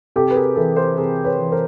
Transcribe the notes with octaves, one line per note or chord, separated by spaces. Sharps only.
C3 G4 A4
B4
G#4 A#4
E3 A4 B4
A#4 C5
C3 G#4 A#4
B4 C#5
E3
A#4 C5